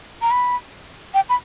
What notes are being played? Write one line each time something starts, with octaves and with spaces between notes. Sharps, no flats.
A#5
B5
G5
B5